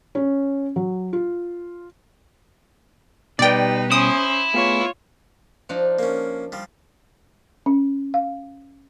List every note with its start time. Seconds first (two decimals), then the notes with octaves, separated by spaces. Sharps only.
0.15 C#4
0.76 F#3
1.13 F4
3.39 B2 G3 D#4 G4 B4 D5 G5
3.92 C#4 E4 C5 D#6
4.54 A3 B3 F4 G#4 C#5
5.69 F3 D4 D#4
5.99 A#3 C#4
6.52 F3 G3
7.66 C#4
8.14 F5